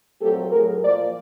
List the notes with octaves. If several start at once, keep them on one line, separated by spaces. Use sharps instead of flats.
A#2 F#3 A3 C4 G4 A4
A2 F#3 A3 G#4 A#4
A#2 F3 A#3 C5 D5